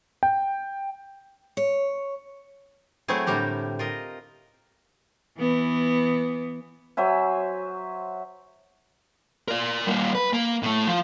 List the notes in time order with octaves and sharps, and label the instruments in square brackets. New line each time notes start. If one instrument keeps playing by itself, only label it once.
[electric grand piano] G5
[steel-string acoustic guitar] C#5
[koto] F#3 A3 C4 E4 G#4
A2 D3 G3 G4 A#4
F4 A#4 D#5
[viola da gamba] E3 B3
[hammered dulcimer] F#3 C5 E5 G#5
[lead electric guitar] A#4 D5
G3 A#3
B4
A#3
A2 A3
F3